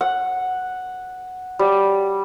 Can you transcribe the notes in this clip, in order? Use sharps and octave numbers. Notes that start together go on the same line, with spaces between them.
F#5
G3